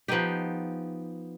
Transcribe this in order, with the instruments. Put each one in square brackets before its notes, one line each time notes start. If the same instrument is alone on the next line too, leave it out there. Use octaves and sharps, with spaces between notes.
[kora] F3 B3 D#4 G4